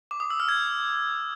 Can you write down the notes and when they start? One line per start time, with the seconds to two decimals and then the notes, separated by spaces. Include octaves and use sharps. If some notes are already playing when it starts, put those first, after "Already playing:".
0.11 D6
0.20 D#6
0.30 E6
0.40 F6
0.49 G#6